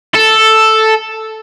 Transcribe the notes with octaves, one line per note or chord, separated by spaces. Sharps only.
A4